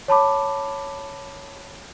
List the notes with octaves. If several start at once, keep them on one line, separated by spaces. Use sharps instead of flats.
C#5 A5 B5 D6